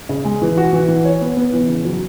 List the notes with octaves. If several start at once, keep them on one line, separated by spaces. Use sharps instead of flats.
C#3
G#3
E3
F#4
E3
E3
C#5
B3
B3
E3
C#3
F#3